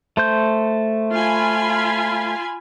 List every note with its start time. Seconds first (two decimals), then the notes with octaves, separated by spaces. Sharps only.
0.17 A3 C5 G6
1.14 F4 G#5 B5